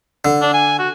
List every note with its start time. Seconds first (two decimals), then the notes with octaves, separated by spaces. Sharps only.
0.25 D3
0.42 D4
0.54 G#5
0.79 F#4